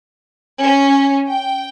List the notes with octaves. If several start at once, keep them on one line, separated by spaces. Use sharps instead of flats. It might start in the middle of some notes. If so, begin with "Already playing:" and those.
C#4
G5